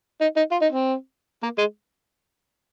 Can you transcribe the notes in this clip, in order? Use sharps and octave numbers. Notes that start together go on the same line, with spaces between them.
D#4
D#4
F4
D#4
C4
A#3
G#3